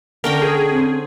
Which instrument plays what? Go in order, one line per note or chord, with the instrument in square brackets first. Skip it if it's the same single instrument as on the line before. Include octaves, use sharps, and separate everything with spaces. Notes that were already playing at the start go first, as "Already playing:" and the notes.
[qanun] D3 C#4 G5 [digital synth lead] A#4
[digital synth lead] G#4
[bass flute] C4